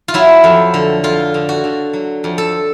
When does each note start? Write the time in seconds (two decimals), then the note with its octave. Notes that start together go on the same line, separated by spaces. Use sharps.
0.08 F4
0.14 F#3 E4
0.44 F2
0.74 D3
1.04 F2 F4
1.34 D3
1.49 F#4
1.64 D3
1.93 F#3
2.24 F2
2.38 A4